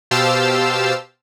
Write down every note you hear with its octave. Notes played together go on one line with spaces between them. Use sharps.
B2 G4 C5 F5 A5 E6